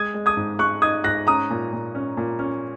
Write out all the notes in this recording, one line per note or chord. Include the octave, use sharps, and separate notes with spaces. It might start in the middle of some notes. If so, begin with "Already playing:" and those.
Already playing: G#3 D#6 G#6
G#3
D#6 G#6
G#2
G#3 C#6 F#6
D#4 D#6 G#6
G#2 F#6 A#6
C#4 A#5 D#6
A#2
A#2
C#4
A#2
C#4